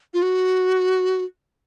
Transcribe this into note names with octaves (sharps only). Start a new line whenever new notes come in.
F4
F#4